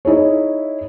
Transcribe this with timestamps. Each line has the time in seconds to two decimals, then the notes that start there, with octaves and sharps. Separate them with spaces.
0.05 D#4 E4 G#4 C#5